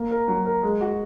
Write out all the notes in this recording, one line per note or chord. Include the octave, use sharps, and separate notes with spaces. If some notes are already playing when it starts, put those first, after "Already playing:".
Already playing: A#3
A#4
F#3
A#4
G#3
F#4